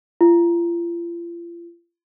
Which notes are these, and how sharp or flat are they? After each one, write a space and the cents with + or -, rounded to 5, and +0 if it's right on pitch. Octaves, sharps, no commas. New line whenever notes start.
F4 -40